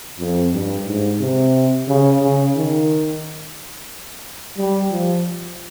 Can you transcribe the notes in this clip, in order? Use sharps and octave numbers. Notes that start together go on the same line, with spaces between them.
F2
G2
G#2
C3
C#3
C#3
D#3
G3
F3